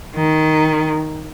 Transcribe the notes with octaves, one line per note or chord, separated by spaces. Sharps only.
D#3